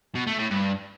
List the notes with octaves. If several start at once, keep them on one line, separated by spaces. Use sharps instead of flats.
B2
A3
A2
G2